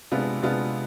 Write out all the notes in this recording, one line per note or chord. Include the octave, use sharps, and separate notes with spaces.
C3 G#3 B3 D4 F4
C3 G#3 B3 D4 F4